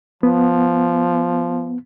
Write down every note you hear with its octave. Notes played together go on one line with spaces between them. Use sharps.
F3 B3